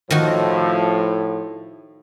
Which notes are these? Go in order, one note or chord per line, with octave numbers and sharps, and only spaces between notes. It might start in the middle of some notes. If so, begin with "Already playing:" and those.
A2 D#3 F3 F#4